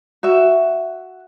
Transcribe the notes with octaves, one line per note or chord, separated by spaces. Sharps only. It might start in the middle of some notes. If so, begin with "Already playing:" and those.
F#4 E5